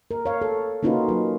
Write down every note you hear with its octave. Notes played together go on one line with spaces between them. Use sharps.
A#4
C#5 F5
A4
A#3 C#4 D#4 F4 F#4 B4
F#3 A#4